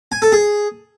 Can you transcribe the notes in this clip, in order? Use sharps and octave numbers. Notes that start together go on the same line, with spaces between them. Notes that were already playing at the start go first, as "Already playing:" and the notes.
G#5
A4
G#4